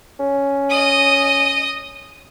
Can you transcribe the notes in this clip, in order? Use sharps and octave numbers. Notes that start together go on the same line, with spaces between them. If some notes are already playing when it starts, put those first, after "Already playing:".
C#4
D#5 D#6